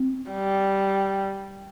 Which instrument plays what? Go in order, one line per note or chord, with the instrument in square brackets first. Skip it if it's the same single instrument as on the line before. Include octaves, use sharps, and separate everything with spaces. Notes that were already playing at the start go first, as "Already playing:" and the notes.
Already playing: [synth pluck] C4
[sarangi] G3